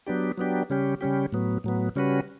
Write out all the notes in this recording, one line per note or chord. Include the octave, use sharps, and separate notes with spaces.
F#3 B3 D4 G4
F#3 B3 D4 G4
C#3 G3 C#4 G4
C#3 G3 C#4 G4
A2 F#3 B3
A2 F#3 B3
C#3 G3 C#4 F#4 B4